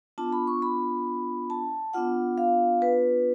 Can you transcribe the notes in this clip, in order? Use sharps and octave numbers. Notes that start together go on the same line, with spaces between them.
B3 D4 F4 A5
B5
C#6
B5
A5
B3 D4 F4 F#5
F5
B4